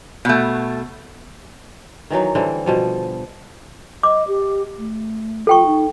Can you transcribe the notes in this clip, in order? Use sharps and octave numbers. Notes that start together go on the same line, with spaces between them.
B2 A3
D#3 E3 F#3 D#4
D3 E3 G3 C4
B2 F3 G3
D#5 D6
G4
A3
F4 A4 G5 C#6
D#4